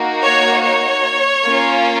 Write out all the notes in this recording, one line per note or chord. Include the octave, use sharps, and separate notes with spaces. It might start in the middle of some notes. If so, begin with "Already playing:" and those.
Already playing: A#3 D#4 F#4
C#5
C#5
A#3 C#4 F4